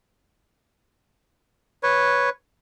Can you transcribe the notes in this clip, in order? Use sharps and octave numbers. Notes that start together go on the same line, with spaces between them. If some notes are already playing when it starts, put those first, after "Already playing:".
B4 C#5